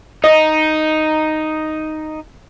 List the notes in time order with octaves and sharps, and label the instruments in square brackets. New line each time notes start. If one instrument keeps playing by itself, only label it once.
[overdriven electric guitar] D#4 [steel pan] D#5